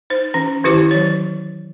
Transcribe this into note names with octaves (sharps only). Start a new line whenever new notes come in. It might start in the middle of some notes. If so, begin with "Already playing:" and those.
D#4 C5
E3 C#4
D#3 E3 E4 G4 C5 D6
F#3 C#5